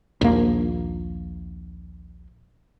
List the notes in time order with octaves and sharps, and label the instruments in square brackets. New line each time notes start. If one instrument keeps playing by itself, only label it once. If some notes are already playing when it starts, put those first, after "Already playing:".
[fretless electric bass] A#1 D#2 A#3